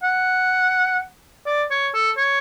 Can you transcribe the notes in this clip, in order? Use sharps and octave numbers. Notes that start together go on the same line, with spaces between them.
F#5
D5
C#5
A4
C#5